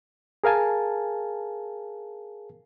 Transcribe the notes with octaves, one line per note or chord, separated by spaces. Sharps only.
G#4 A#4 F5 G#5 A5